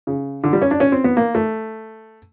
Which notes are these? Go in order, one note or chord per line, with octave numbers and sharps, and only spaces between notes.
C#3
D3
G3
C#4
D4
C#4
C4
B3
A#3
A3